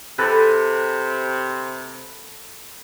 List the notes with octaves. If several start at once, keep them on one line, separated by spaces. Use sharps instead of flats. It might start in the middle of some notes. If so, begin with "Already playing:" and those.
C3 A4 B4